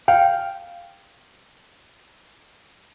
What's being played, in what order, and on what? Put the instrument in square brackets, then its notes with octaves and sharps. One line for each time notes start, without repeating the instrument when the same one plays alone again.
[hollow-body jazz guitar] F5 G5